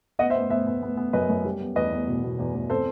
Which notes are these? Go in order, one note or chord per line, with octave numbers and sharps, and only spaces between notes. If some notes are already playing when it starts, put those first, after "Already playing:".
B3 D#5 F#5
C5 E5
B3
B3 C5 E5
B3
B3
B3
F#2 B4 D#5
F#2
G3
B3
E2 B4 D#5
B3
B2
B2
E2
E2
C4 A4 C5